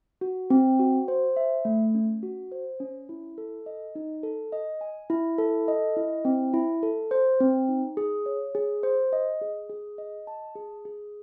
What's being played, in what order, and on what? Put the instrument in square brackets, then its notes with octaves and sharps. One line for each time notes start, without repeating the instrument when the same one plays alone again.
[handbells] F#4
C4
F#4
C5
E5
A3
C#4
F#4
C5
C#4
E4
A4
D#5
D#4
A4
D#5
G#5
E4
A4
D#5
E4
C4
E4
A4
C5
C4
D#4
G#4
C#5
G#4
C5
D#5
G#4
G#4
D#5
A5
G#4
G#4